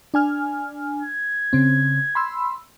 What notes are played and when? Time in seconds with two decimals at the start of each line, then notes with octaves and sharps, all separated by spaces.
0.14 D4 G#5 F6
1.01 G#6
1.53 C#3 C4
2.15 B5 C6 E6